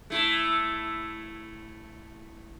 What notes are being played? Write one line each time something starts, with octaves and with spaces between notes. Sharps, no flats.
A3 E4